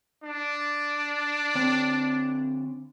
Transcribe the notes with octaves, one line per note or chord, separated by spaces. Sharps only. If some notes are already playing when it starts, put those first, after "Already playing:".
D4
D3 C4 C#5